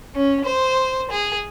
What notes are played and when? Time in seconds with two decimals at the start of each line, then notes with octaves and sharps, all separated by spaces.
0.15 C#4
0.45 C5
1.11 G#4